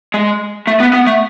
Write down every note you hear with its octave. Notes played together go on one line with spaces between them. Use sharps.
G#3
A3
B3
B3
A3